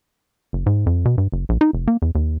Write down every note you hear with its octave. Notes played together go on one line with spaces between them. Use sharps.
F#1
G#2
F2
B2
G2
F#1
A#1
D#4
F1
A#3
E2
D#2